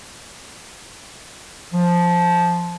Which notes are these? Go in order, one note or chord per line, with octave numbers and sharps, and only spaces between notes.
F3